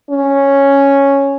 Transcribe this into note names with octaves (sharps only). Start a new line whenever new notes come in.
C#4